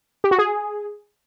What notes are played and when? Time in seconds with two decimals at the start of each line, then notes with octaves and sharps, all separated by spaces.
0.24 G4
0.31 F#4
0.38 G#4